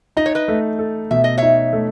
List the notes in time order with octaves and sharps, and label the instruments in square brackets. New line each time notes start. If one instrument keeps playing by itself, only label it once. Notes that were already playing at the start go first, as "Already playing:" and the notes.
[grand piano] D#4 [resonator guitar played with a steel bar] D#5
[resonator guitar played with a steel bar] C#5
B4 D#5
[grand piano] A3
A4
[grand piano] B2 [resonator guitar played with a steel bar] E5
[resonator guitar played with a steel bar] D#5
[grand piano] D#4 [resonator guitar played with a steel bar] C#5 E5
[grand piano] A3